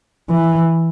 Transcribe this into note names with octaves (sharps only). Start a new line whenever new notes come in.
E3